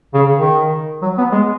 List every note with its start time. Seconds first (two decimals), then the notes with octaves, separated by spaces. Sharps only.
0.14 C#3
0.36 D#3
1.02 F#3
1.18 B3
1.32 G#3